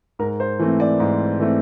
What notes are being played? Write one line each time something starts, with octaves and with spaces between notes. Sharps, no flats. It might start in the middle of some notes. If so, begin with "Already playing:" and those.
G#2 A#4
C5
E3 A3 C4
D5
G#2
E3 A3 C4